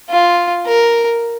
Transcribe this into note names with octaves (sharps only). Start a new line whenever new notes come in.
F4
A#4